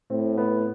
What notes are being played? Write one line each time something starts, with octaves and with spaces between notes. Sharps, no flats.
A2 C4
B3